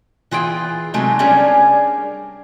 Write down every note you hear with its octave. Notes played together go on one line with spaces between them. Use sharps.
E3 F4 G#4 G5
C3 F#3 G#3 A3 D#4
G3 C#4 D4 G#4 A#4 C#5